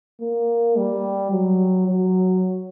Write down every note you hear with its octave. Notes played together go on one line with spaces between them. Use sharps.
A#3
G3
F#3
F#3